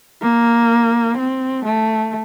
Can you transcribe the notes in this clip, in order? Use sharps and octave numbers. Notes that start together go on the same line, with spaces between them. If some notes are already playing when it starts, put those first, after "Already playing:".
A#3
C4
A3